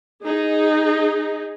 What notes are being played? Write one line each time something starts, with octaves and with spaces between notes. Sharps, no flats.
D#4 G#4